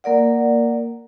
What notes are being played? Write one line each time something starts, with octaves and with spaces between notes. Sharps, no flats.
A#3 A#4 D5 F#5